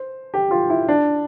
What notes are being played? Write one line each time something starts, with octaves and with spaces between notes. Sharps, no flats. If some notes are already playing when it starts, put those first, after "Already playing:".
Already playing: C5
G4
F4
E4
D4